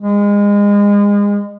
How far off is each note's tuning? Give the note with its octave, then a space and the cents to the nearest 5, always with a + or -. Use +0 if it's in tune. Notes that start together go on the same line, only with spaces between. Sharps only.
G#3 -30